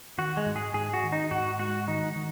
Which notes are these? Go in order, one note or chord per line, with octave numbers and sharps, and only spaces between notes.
D#3 F#4
G#3
G#2
G#4
G#2 G#4
F#4
D#3
D#4
G#2 F#4
G#3 F#4
D#3 D#4
D#3